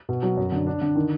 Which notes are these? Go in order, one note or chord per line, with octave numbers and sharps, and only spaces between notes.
B2
F#3
F#2
D3
D4
D3
D#3